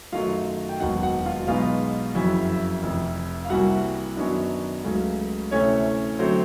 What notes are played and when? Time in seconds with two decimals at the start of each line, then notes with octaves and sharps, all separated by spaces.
0.13 F#2 D#3 F#3 A3 F4 F5
0.69 G5
0.80 E1 D#2 D#3 F#3 F#4 F#5
1.02 F#4 F#5
1.26 F4 F5
1.47 B1 B2 G#3 B3 D#4 F4 F5
2.15 F#1 F2 C#3 F#3 E4 E5
2.83 F1 F2 C3 F3
3.45 F5
3.50 C2 C3 E3 G3 A#3 F#4 F#5
4.17 F#2 D#3 F#3 B3 D4
4.84 C#2 C#3 F#3 A3
5.51 D2 C3 E3 A3 C#4 C#5
6.19 D3 F#3 A3 C4 C5